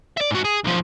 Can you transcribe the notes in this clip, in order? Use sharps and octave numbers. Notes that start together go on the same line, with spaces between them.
D5 E5
G#2 F#4
G#4
B1 F3